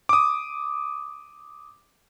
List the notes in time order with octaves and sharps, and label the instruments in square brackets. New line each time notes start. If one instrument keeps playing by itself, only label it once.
[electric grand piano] D6 D#6